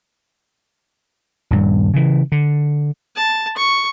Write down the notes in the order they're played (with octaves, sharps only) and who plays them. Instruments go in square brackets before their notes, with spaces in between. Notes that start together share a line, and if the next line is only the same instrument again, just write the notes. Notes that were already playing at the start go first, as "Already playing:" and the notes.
[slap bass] D#1 G2
C#3 E3
D3
[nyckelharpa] A5
C#6